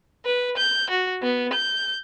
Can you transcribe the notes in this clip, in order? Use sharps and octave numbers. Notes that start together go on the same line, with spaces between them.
B4
G6
F#4
B3
G6